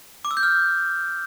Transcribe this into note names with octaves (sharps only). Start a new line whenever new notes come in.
D6
E6
G6
F6